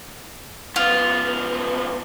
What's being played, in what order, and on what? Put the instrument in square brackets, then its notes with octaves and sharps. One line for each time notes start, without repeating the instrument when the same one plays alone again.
[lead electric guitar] C#2 B3 [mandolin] F4